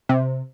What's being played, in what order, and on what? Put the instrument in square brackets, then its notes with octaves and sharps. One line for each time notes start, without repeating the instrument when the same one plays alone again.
[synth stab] C3